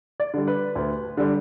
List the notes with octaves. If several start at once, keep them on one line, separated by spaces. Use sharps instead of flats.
D5
D3 G3
B4
D2
D3 G3